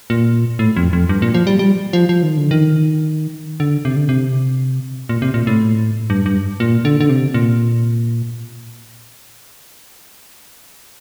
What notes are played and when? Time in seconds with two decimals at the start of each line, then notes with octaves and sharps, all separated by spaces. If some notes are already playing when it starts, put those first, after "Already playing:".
0.10 A#2
0.59 A2
0.77 F2
0.93 F2
1.09 G2
1.22 A#2
1.34 F3
1.47 G3
1.59 G3
1.93 F3
2.09 F3
2.23 D#3
2.37 D3
2.51 D#3
3.60 D3
3.85 C3
3.96 D3
4.09 C3
5.09 A#2
5.22 C3
5.34 A#2
5.47 A2
6.10 G2
6.26 G2
6.60 A#2
6.85 D3
7.01 D3
7.10 C3
7.34 A#2